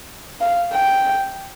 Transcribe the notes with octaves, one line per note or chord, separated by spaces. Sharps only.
F5
G5